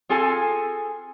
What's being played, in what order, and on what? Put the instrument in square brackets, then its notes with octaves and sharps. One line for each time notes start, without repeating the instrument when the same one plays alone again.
[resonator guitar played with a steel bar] C4 F4 G#4 A4 G#5